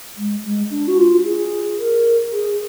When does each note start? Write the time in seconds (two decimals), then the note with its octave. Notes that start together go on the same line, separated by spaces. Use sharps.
0.17 G#3
0.43 G#3
0.70 D4
0.87 F#4
0.98 F4
1.24 G#4
1.79 A#4
2.32 G#4